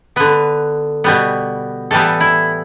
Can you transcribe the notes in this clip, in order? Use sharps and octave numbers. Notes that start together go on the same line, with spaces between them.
D3 B3 B4
B2 G3 B3
A2 E3 G3 B3 A4
E4